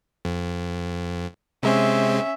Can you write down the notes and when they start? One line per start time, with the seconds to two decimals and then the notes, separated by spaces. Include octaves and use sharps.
0.25 F2
1.63 C3 G#3 C4 C#4 E5